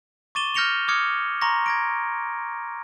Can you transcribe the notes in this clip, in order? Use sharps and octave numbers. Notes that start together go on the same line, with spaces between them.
C#6 D6 A6 D#7 E7 G7
F6 G6 A#6 C#7 F7 G7
D6 D#6 F6 G#6 C#7
A#5 C6 C#6 A#6
G#6 A#6 D7